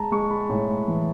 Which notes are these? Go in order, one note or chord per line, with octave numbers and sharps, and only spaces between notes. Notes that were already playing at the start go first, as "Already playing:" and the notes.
Already playing: G#3 A5 A#5
G#3 C#6
B5
A2
E3